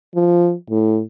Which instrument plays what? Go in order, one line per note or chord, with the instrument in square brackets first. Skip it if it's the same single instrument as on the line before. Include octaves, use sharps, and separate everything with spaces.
[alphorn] F3
A2